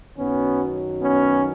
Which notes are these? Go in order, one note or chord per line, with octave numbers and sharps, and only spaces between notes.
F#2 D#3 F#3 B3 C#4
B3 C#4